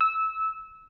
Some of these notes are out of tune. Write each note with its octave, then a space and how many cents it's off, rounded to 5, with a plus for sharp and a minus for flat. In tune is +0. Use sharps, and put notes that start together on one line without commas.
E6 -20